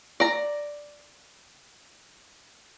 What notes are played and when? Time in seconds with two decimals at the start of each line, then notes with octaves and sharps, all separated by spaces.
0.20 D5 A#5